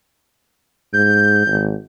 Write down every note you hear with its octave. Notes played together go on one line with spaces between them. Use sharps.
G#2 G6
G#1